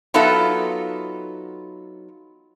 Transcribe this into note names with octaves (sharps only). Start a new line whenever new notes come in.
F#3 B3 D#4 F4 A4 E5